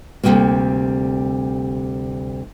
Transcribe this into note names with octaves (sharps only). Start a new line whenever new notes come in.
D2 G2 C3 G3 A#3